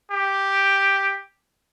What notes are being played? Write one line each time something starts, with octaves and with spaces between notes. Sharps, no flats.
G4